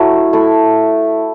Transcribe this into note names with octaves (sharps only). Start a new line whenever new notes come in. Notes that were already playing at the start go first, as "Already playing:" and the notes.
Already playing: F#3 A3 E4
A3 E4